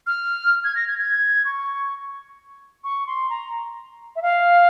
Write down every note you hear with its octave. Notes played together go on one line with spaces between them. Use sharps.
F6
G#6
A#6
G#6
G#6
C#6
C#6
C6
A#5
E5
F5